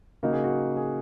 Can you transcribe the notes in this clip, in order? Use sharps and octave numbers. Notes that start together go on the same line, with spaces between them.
C#3 A#3 D#4 F#4
G#4
F#4
G#4